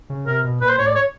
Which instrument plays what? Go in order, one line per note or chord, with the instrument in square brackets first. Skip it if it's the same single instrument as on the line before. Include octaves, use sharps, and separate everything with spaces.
[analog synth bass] C#3
[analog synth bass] C3 [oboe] A#4
[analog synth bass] B2
[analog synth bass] A#2 [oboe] B4
[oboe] C5
[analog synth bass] A2 [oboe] C#5
[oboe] D5
C#5